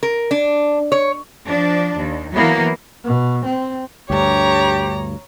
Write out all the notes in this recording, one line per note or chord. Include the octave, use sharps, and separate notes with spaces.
A#4
D4
C#5
F3 D4
D#2
E3 F#3 A#3 B3 E4
B2
C4
D2 G2 G4 C#5 A#5